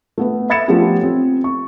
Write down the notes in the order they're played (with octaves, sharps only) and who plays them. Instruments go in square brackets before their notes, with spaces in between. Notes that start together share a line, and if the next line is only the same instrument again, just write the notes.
[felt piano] A3 B3 B4
E5 B5 G#6 A6 C#7 E7
F3 A3 B3 C#4 F4 G4
C4
C#6